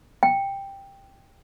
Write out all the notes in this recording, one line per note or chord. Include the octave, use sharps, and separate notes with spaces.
G5